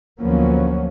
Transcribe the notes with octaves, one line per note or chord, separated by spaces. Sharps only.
D2 F3 F#3 A#3 B3 C#4